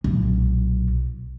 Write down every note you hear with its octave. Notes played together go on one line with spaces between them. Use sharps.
B1 A#2